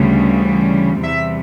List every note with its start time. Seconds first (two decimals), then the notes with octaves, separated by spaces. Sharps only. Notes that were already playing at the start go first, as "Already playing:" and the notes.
Already playing: D2 C#3 E3 G3
1.02 E2 C3 E3 G3 E5